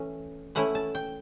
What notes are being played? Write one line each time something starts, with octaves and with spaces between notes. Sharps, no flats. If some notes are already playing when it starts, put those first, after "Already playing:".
Already playing: E3 A3 C#4
E3 A3 C#4 E4 F#5
A5
G5